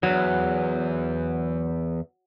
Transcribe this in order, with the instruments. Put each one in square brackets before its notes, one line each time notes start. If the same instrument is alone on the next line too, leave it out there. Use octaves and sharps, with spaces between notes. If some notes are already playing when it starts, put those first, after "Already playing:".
[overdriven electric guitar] E2 [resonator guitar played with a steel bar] F#3